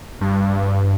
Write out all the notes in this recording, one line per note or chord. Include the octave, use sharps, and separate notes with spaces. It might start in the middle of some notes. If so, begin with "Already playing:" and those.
G2